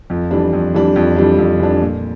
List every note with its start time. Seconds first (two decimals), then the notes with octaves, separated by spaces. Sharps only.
0.10 F2
0.31 E3 G3 D4
0.53 F2
0.74 E3 G3 D4
0.96 F2
1.17 E3 G3 D4
1.38 F2
1.59 E3 G3 D4
1.81 A#2